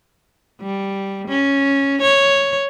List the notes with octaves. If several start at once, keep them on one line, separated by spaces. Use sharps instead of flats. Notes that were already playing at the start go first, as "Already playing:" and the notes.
G3
C#4
C#5